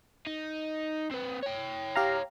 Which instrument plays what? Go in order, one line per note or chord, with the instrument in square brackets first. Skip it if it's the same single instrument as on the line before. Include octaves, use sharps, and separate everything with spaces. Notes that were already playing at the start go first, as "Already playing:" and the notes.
[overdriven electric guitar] D#4
C4 B4
C#5 G5
[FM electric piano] G4 F5 A#5